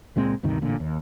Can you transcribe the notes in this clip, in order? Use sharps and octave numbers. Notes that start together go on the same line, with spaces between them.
C#2 A#2 G#3 C4
D2 G2 C3 D#3
A1 A#2 D3
D#2